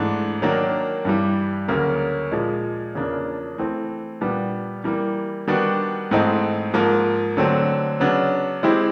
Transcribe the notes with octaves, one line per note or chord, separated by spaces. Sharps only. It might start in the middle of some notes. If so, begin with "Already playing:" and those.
Already playing: G#2 E3 A3 D4
D#3 F#3 A#3 D4
G2 E3 G3
D2 C#3 F#3 A#3
A#2 F3 G#3
E2 C#3 F3 A#3 D4
E3 A3 C4
A#2 G3 B3 D4
E3 G3 A#3
D#3 G3 B3 D4 F#4
G#2 E3 A3 C4 D#4
G#2 F3 A#3
D3 F#3 A3 C4
C#3 F#3 B3 D4
E3 G#3 C4 E4 G4